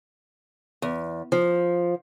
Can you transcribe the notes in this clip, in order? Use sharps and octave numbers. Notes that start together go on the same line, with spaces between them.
E2
F3